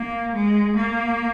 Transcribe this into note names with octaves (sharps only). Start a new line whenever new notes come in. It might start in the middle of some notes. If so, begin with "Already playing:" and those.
Already playing: A#3
G#3
A#3